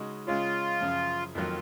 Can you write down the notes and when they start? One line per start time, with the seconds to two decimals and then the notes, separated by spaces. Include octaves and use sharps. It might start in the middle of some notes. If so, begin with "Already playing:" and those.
Already playing: C#3 G#3 D#4 F#4
0.27 C#3 G#3 C#4 F4
0.81 F#2 C#3 F3
1.35 F2 D#3 F#3 A#3 F4